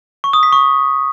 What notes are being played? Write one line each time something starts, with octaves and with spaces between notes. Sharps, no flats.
C#6
D#6
B6
C#6